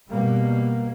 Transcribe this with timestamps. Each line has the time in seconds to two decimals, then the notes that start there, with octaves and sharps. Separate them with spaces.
0.10 B2 G3 A#3